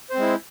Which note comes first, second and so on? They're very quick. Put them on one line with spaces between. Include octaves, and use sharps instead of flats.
C5 C4 G#3 E4